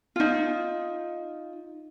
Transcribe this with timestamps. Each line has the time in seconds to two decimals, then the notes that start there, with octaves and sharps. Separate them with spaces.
0.16 D#4 F4